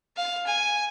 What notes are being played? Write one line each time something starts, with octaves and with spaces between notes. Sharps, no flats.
F5
G#5